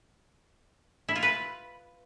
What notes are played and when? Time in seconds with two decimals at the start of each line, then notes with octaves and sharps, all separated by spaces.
1.09 E4
1.16 F4
1.23 B4